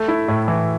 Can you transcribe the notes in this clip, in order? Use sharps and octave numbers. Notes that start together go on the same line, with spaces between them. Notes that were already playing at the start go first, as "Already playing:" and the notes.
Already playing: A3
E4
A2
E3